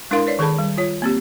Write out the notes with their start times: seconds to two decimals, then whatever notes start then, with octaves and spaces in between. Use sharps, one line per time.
0.11 G#3 D4 E4 A#4 F5 C6
0.27 B4 C#5 D5
0.39 D#3 G#4 A4 A5 B5
0.58 G3
0.78 F4 C#5
1.02 A#3 C4 G4